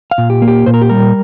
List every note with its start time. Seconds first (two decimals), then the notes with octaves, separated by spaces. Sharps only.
0.11 F5
0.18 A#2
0.30 G4
0.42 A#3
0.48 G4
0.66 A#2 C5
0.74 A#4
0.82 G4
0.89 G3 A#4